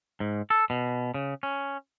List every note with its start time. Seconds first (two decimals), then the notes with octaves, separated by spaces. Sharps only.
0.20 G#2
0.50 A4
0.70 B2
1.14 C#3
1.43 C#4